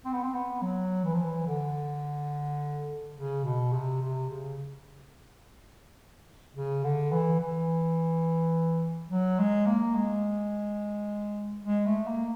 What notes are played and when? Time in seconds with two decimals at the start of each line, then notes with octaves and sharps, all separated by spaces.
0.05 C4
0.13 B3
0.22 C4
0.34 B3
0.62 F#3
1.05 E3
1.14 F3
1.23 E3
1.47 D3
3.16 C#3
3.44 B2
3.72 C3
4.01 C3
4.30 C#3
6.55 C#3
6.84 D3
7.12 E3
7.40 E3
9.10 F#3
9.39 G#3
9.67 A#3
9.95 G#3
11.65 G#3
11.86 A3
12.07 A#3